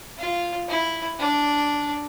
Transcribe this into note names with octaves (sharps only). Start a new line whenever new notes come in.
F4
E4
D4